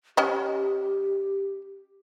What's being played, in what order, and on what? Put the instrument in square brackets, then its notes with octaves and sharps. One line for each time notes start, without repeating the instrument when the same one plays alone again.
[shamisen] C#4 D#5 [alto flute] G4